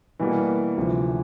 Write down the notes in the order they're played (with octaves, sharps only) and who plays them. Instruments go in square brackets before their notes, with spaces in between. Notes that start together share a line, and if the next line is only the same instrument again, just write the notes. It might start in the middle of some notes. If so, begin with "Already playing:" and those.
[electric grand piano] B2 G3 A#3 [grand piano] E3
[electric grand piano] D2 C3 F3